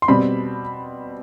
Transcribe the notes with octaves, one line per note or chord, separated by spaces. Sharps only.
C6
B2 G3 C4 B5